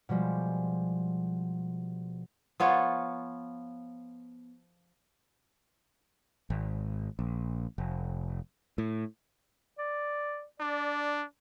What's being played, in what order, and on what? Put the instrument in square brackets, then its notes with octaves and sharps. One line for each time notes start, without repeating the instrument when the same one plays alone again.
[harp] B2 F3 G3 G#3
[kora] F3 B3 F4 C#5
[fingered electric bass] G#1
A#1
F1
A2
[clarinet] D5
[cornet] D4 [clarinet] D5